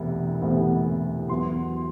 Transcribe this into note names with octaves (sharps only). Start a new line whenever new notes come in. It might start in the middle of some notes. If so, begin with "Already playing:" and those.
Already playing: E1 D2 C3 E3 B3
E1 D2 C3 E3 B3
E2 B2 F#3 B3 C6